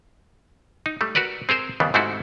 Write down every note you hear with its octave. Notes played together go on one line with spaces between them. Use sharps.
D#4
G3 A3
F#4 A#4 B4 D5
C4 G#4 A#4 C5
D#2 C#3 G3 B3
G#2 G3 A3 C4 E4 F#4